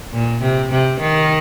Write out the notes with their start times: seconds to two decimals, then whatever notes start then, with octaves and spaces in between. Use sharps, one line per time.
0.13 A#2
0.41 C3
0.71 C3
1.00 D#3